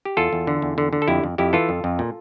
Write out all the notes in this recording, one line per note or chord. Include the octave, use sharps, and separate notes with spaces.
G4
E2 F4 A4
E2
D3
E2
D3
D3
A4
F2 E4 G4
F2
F2 E4 G4
E3 F4 A4
F2
F2
A#2